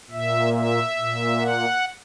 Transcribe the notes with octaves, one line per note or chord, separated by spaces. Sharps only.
A#2 E5
E5
A#2
F#5